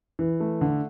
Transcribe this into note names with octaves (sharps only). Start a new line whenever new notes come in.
E3
A3
D3